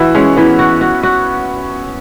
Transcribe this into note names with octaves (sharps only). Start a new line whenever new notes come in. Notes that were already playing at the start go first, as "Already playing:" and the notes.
Already playing: E3 E4 F#4
G#3 C#4
E3 B3
F#4
F#4
F#4